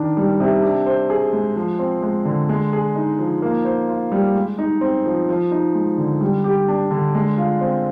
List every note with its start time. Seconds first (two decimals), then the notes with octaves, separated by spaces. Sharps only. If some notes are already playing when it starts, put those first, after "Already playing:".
Already playing: D#3 D4
0.17 G3
0.40 C3
0.63 D4
0.86 C5
1.10 G#4
1.33 G#3
1.56 F3
1.79 C4
2.02 G#3
2.25 D3
2.49 G#3
2.73 G#4
2.95 D#4
3.19 F3
3.42 A#3
3.65 C5
3.89 F4
4.12 G3
4.35 G#3
4.58 D#4
4.81 C4
5.06 F3
5.29 F3
5.51 D#4
5.74 G#3
5.98 D3
6.21 G3
6.44 G4
6.68 D4
6.91 D3
7.15 G#3
7.38 F4
7.61 C4